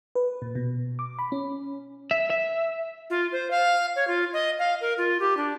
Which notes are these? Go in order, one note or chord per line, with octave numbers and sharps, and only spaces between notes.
B4
A#2
B2
D6
B5
C#4
E5
E5
F4
C5
F5
C#5
F4
D#5
F5
A#4
F4
G4
D4